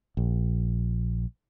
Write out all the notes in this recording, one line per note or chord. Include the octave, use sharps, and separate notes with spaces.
A#1